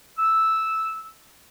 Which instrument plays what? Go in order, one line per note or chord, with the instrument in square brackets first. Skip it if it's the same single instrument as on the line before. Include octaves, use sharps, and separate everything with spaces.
[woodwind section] E6